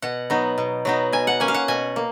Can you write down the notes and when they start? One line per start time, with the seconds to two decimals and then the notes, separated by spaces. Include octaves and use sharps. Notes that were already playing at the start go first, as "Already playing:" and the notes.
0.02 B2 F#5
0.30 F#3 B3 D#4
0.58 B2
0.85 F#3 B3 D#4
1.12 B2 G#5
1.27 F#5
1.40 A#3 C#4 G#5
1.48 F5
1.54 F#5
1.68 B2 G#5
1.96 A#3